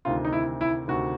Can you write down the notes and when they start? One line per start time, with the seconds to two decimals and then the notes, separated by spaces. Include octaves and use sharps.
0.05 D2 C3 D#3 F4
0.25 D#4
0.33 E4
0.61 E4
0.88 D2 C3 D#3 F#4